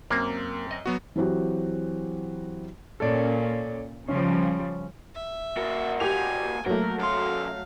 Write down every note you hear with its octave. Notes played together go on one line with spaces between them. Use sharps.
F#2 A#3 C4
D#5
F#3 B3 F#4
E3 F#3 C4 F#4 G4
A#2 C#4 A4 C#5 D5
C#3 F3 G3 C#4
E5
A#3 F#4
G4 G#5 F7
F#3 A3 A#3 A#4
F#2 F5 C6